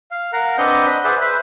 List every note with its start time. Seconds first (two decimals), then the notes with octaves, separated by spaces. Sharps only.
0.11 F5
0.33 A#4 F5 F#5 A#5
0.58 C4 D4 B4 D#5 F#5 G6
0.86 D#5 F#5 B5
1.04 G#4 B4 C5 D5 E5
1.21 B4 C5 E5 B5